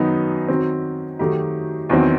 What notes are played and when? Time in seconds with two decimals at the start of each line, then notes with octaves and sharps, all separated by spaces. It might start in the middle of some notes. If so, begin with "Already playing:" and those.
Already playing: F#2 D#3 F#3 B3 D#4
0.48 D#3 F#3 C4 F#4
1.19 D#3 F#3 A3 D#4 G4
1.89 E2 D#3 F#3 C4